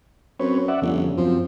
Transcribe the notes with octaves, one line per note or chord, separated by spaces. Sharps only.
F#2 C4 B4 C#5
D5 E5 F#5
G1 F2 C#3
F#2 F3 C4